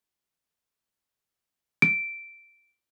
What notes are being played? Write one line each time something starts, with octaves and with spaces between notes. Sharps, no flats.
D7